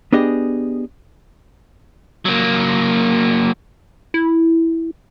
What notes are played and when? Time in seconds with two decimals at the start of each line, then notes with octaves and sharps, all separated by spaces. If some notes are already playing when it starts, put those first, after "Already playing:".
0.12 B3 D4 G4 G#4 D#5
2.25 F#3 A#3
4.14 E4